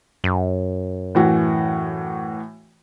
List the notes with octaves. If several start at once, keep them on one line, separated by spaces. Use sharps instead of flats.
F#2
A2 E3 F#4